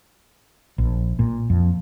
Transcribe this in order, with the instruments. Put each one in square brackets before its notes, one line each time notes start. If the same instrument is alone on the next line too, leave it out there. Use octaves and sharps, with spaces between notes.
[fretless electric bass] A#1
A#2
F2